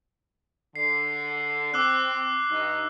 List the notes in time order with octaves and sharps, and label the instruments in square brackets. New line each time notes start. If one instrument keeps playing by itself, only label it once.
[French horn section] D3 [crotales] C7
[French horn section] C4 [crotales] D6 E6 F#6
[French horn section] G2 D#4